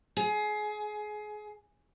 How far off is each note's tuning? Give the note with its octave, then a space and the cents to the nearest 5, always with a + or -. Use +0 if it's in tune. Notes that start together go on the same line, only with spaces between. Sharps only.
G#4 +25